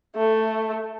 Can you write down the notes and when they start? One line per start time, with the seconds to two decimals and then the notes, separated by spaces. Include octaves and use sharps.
0.16 A3